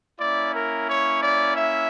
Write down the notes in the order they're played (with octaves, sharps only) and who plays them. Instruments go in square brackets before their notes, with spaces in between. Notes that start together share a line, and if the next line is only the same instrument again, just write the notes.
[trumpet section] A#3 C#4 E4 D5
A#4
C#5
D5
E5